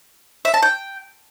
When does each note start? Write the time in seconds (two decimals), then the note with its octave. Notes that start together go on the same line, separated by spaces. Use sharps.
0.45 E5
0.54 A5
0.63 G5